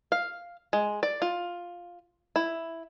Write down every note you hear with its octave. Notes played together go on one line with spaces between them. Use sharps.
F5
G#3
D5
F4
E4